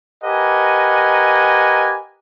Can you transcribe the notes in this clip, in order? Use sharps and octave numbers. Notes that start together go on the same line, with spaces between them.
G4 A#4 B4 D#5 F#5 G#5